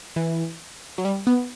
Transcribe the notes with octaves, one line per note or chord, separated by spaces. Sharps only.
E3
F#3
G3
B3